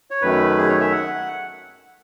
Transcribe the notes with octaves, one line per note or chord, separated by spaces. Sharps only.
C#5
F#2 D#3 A3 B4
G#4
C#5
E5
F#5